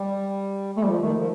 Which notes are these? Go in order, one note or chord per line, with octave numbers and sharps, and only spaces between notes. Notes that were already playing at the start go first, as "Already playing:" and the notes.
Already playing: G3
A3
F3 G3
D#3 A3
F3